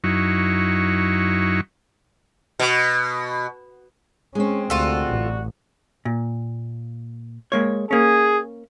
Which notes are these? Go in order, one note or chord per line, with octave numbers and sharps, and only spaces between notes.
F#2 F#3 D#4 E4 C#6
B2
G#3 C4 C#4
D2 C3 G3 F4 F#4 A4
A1
A#2
G#3 A#3 C#5
A#3 C#4 G#4